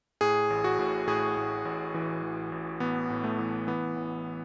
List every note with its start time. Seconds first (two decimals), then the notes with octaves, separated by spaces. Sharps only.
0.21 A2 G#4
0.50 A1
0.64 F#4
0.79 A2
1.07 A2 G#4
1.37 A2
1.65 A1
1.94 E3
2.23 A1
2.52 A1
2.80 A1 B3
3.10 A2
3.24 A3
3.39 E3
3.67 E3 B3
3.96 A1